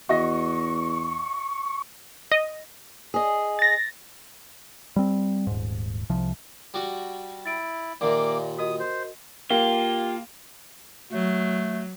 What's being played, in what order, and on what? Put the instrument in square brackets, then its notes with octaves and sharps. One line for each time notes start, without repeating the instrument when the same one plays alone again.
[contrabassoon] E2 [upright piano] F#4 D#5 A#6 [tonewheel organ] C#6
[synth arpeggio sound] D#5
[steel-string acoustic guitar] G#4 D#5
[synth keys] A6 A#6
[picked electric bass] G3 C4
D#1 G#2
C2 C3 F3
[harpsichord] G3 F#4
[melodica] E4 [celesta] A6 D7
[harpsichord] D#2 A#2 [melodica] A#3 D6 [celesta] D5 E5
[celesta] F#4 A#4 D#5 [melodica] D#6
[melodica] C5
[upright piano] A#3 [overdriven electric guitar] F4 [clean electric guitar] G4
[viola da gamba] F#3 [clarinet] A3